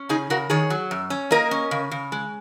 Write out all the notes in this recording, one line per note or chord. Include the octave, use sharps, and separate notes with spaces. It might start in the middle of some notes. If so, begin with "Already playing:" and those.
Already playing: C#4
C#3 D#4 G#4
C#3 F#4 A#4
D#3 G#4 C#5
F#3
F#2
C#4
A#3 A#4 D#5
C#4
C#3
C#3
G#3